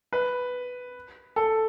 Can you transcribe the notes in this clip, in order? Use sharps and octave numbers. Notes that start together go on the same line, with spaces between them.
B4
A4